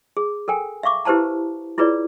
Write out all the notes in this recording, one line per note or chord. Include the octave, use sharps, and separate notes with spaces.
G#4
A4 A#4 G5 G#5
E5 F5 C#6 D6
E4 G4 B4 C5 A5 A#5
E4 F4 G#4 B4 C#5 D5